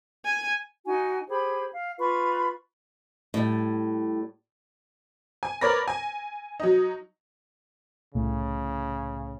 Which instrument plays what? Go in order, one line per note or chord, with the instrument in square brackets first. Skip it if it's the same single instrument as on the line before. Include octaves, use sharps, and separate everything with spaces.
[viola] G#5
[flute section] D#4 F#4 G#5
G4 G#4 C5 B5
F5
F4 B4 B5 C#6
[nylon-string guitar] A2 G3
[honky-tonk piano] G#5
A#4 B4 C#5 D5 B5 A#6
G#5
F#3 D#4
[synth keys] C2 A2 A3 [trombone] C#3